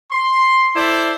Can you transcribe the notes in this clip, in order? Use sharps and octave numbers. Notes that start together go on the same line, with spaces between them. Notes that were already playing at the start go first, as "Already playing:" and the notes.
C6
E4 A4 C5 D5 E5